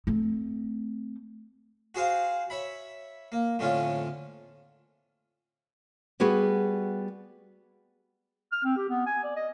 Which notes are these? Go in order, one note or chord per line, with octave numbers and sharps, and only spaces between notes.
A3 C4
F#4 G#4 C5 F5
C#5 E5 B5
A#3
F2 A2 D3 C#4 F4
G3 B3 F#4 G#4 B4
F6
C4
G4
B3
G#5
D5
D#5